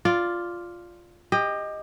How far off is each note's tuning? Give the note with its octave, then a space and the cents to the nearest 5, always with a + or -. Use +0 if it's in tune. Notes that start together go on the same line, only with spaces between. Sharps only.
F4 +0 D5 +0
G4 +25 D#5 +0